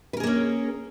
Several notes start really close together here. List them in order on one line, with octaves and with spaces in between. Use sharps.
B4 A#4 G#4 A#3 C#4